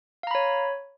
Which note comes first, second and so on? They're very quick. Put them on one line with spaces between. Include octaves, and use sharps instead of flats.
F5 A#5 B5 C#5